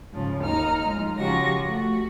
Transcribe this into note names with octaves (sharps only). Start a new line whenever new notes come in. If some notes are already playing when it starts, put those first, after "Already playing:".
G#2 C#3 F3
D#2 D#4 A#5 F6
F3 G#3
C#3 F3 F#4 G4 C#6 A#6
A3 F#4